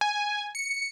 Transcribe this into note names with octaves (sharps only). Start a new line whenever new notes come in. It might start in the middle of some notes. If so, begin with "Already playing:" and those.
G#5
C#7